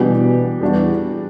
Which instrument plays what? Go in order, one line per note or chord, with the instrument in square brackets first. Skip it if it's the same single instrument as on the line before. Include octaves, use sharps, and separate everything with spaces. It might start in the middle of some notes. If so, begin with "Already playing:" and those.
Already playing: [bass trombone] B2 [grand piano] E3 G3 B3 D4 G4
[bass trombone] E2 [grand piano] G3 D4 F#4